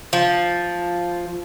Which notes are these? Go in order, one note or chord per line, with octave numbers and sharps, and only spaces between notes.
F3